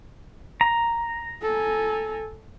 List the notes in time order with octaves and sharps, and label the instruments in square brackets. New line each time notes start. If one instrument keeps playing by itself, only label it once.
[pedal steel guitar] A#5
[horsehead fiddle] A4 G#5